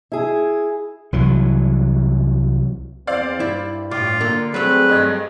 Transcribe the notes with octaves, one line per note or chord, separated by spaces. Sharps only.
E4 G#4
C2 E3 F#3
E2 C4 C5 D5 F5
G2 E4
A2 F4 D6
D3 A#3
F#3 G3 A3 C4 G#4 B4
G2 D#5 G#6